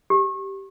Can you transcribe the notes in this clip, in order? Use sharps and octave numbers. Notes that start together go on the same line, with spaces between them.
G4